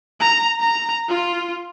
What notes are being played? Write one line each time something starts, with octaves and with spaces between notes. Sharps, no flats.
A#5
A#5
F4